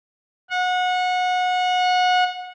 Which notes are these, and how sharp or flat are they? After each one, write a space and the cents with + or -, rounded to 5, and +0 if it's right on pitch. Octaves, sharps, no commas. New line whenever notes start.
F#5 -25